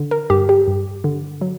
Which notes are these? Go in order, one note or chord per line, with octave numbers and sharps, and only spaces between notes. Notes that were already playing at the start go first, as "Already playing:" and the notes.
Already playing: D3
A#4
G2 G4
G4
G2
D3
F#3